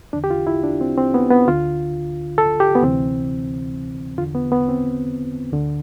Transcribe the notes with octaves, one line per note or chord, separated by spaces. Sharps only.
E2 D3 D4
G4
F4
E4
D4
C4
C4
B3
B3
D2 D3 F4
A4
G4
B3
D2 C3 E3 C4
E2 D3 F4
B3
B3
C4
D2 D3